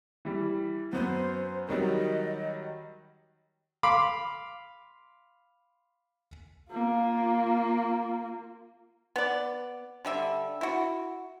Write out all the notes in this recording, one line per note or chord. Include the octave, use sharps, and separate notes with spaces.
E3 G3
F#2 B3 C5
D#3 F#3 G3 D#5
F5 B5 C6 D6
A#3 F4
B3 D5
D3 G3 E5
E4 F#4